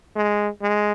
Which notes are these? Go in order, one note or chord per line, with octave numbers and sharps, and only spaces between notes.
G#3
G#3